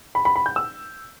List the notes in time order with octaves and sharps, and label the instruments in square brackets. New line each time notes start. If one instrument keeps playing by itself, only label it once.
[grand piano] B5
B5
B5
G6
E6